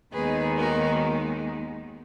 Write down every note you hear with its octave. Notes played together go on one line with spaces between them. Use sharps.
D#2 D#3 G#3 B3 D#4 G#4 B4
F#4 A#4